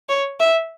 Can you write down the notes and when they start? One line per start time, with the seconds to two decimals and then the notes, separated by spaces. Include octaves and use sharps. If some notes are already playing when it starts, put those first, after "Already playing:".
0.09 C#5
0.40 E5